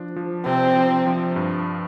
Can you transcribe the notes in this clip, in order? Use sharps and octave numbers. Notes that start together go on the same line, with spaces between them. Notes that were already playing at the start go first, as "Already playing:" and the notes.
Already playing: F3 D4
F3
C3 C4
F3
F3
G2